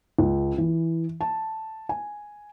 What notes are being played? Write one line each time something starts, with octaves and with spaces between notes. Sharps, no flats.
C#2
E3
A5
G#5